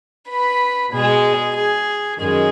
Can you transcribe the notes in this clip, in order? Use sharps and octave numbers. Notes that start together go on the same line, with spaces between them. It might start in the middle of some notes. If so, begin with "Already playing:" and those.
B4 B5
B2 G#3 G#4
G#4
F#2 D#3 G#3 G#4